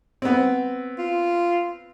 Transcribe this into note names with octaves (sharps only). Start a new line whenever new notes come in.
B3 C4
F4